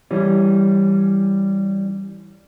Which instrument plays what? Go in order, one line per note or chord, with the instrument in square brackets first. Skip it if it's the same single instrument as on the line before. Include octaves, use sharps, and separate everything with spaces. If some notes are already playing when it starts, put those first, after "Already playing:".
[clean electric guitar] E3 G3 C#4